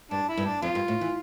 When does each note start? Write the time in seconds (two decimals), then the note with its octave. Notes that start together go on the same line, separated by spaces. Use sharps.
0.11 G2 D4
0.29 E4
0.37 G2
0.46 D4
0.62 F2 F4
0.75 G2
0.88 A2
1.01 E3